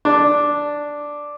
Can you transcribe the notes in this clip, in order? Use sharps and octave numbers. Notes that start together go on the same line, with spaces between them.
D4